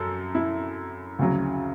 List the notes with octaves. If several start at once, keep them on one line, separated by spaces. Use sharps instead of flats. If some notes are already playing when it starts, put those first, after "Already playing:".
Already playing: F#2 A4
E4
D2 C#3 F#3